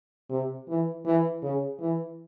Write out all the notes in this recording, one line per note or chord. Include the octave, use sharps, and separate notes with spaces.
C3
E3
E3
C#3
E3